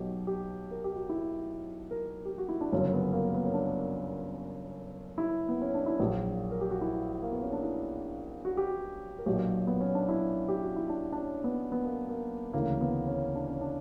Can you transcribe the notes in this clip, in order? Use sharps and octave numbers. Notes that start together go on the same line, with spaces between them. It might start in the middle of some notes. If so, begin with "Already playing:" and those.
Already playing: B1 B2 F#3 G4
G4
A#4
G4
F#4
E4
A#4
G4
F#4
E4
D4
G1 F#2 C#3 F#3 C#4
B3
A#3
B3
C#4
D4
E4
B3
C#4
D4
E4
A#1 A#2 F#3 F#4
A#4
G4
F#4
E4
A#3
B3
C#4
D4
E4
F#4
G4
F#4
A#4
B1 A#2 F#3 G4
B3
C#4
D4
E4
G4
F#4
E4
D4
D4
C#4
B3
B3
A#3
A#3
D2 C#3 E3 A#3
B3
C#4
D4
C#4
D4